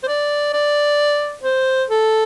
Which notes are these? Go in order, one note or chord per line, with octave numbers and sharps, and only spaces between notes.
C5
D5
D5
C5
A4